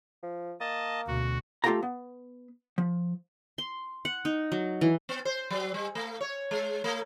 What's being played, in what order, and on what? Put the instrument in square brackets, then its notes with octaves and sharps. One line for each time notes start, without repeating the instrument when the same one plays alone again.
[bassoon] F3
[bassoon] A#3 [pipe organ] D#5 A5
[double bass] D2 B2 [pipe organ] F#4
[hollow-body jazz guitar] A3 F4 G4 A4 F5 A#5
B3
F3
[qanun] C6
F#5
D#4
F#3
E3
[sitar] B3
C5
F#3
G3
A3
C#5
G#3
A3